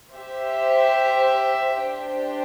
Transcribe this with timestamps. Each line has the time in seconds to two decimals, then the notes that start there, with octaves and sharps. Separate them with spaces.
0.12 G4 C5 E5
1.78 D4 G4 C5 G5